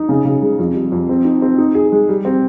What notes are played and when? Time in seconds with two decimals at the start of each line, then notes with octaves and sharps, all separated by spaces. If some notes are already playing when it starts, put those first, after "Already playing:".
Already playing: D#4
0.09 C#3
0.25 C#3
0.42 G#3
0.59 F2
0.75 G3
0.92 F2
1.09 C4
1.25 D#4
1.42 C4
1.58 D#4
1.75 G#4
1.92 G#3
2.09 G3
2.25 C4